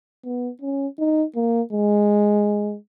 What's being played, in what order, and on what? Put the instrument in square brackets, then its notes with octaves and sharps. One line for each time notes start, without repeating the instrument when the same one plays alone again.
[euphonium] B3
C#4
D#4
A#3
G#3